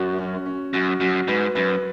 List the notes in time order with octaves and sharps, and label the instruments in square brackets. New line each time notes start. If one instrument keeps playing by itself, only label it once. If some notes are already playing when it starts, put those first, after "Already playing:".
Already playing: [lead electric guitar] F#2 [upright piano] F#4
[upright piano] C#4
C#4
[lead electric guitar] F#2 [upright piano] F#4
[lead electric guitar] F#2 [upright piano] F#4
[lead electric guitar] G#2 [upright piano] B4
[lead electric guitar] F#2 [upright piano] B4